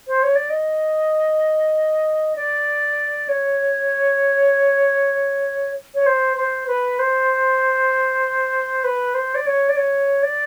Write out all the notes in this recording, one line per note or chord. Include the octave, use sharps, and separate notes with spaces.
C5
C#5
D5
D#5
D5
C#5
C#5
C5
C5
B4
C5
B4
C5
D5
C#5
D5
C#5
D5